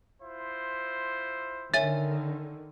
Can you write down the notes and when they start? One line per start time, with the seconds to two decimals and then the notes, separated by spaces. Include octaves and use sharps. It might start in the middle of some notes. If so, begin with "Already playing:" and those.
0.21 E4 F4 C5
1.74 D3 D#3 C#5 E5 G#5 A6